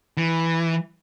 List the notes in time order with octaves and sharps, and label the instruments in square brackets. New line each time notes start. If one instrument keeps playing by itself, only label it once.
[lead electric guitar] E3